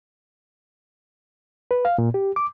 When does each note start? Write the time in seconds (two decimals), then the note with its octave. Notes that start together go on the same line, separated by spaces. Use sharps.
1.71 B4
1.85 F5
1.98 A#2
2.14 G4
2.36 D6